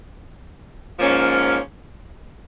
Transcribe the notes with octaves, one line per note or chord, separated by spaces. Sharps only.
G#2 F3 A#3 C#4